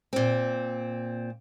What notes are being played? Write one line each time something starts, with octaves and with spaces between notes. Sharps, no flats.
A#2 C4